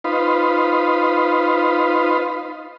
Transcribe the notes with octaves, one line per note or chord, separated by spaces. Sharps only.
D#4 F4 B4 C5